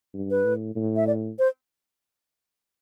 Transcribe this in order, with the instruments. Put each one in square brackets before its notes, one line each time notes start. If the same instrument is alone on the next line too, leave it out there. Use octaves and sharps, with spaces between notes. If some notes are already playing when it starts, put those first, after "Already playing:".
[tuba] G2
[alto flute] B4
[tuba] A2
A2
[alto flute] E5
D5
C5